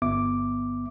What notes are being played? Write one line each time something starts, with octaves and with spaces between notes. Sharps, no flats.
G1 B3 E5 D6